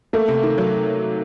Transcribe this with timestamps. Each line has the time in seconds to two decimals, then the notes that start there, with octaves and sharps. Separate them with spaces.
0.13 A3 A#3
0.28 C3
0.43 D#3
0.58 F#3